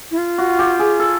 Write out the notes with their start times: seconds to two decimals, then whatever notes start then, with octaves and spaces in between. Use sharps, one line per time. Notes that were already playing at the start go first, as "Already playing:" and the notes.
0.11 E4
0.18 F4
0.38 F#4
0.59 G4
0.79 G#4
1.00 A4